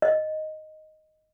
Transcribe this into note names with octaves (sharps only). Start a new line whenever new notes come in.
D#5